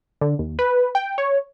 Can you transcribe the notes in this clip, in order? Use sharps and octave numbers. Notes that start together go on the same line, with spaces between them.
D3
D#2
B4
G5
C#5